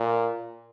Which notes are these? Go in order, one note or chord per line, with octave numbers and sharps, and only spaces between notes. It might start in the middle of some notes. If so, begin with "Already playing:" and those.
Already playing: A#2